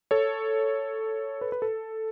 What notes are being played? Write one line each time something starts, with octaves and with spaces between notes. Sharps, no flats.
A4 C#5
B4
B4
A4